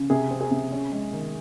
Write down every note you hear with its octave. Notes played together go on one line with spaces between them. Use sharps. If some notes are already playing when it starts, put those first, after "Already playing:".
Already playing: C#3
C3 G#4
C4
G#4
C3
C#4
G#3
D#3